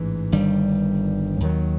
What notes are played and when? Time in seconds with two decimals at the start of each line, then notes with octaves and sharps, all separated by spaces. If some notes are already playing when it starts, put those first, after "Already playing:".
Already playing: A1 G#2 E3
0.32 G1 G2 D#3 G3
1.40 D#2 D#3 F#3